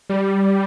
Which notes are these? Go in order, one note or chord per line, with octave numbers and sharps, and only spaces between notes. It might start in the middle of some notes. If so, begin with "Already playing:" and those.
G3